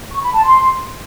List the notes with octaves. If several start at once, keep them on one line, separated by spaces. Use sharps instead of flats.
C#6
B5
A5
C6